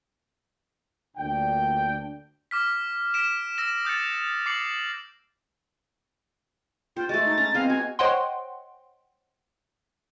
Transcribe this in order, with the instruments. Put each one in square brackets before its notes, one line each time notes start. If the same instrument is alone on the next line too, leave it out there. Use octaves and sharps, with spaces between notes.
[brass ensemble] D2 A#2 D4 G5
[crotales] D6 F6 B6
B6 D7 E7
E6 A#6 E7
D#6 G6 A6 C#7
D6 C7 C#7 F#7
[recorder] F4 [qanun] C5 [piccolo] G5
[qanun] G#3 A3 [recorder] F#4 [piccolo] A6
[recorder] D#4
[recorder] C#4 [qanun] A#5
[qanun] B3 G#4 D#5 [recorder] C4 [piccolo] F5
[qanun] F#4 [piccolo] G#5
[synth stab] C5 C#5 D#5 F#5 G5 C6